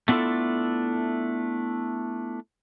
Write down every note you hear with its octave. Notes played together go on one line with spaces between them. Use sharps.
A3 B3 D4 E4 F4 A4